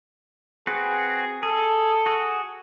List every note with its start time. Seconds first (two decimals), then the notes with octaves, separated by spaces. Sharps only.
0.67 C4 F#4 G#4 B4
1.43 G#4 A4
2.06 F#4 G#4